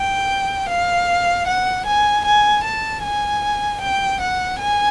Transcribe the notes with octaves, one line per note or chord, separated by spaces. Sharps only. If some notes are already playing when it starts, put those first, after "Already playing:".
Already playing: G5
F5
F#5
G#5
G#5
A5
G#5
G5
F#5
G#5